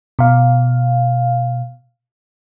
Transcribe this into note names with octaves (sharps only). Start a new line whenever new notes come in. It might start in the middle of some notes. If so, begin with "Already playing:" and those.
B2 F5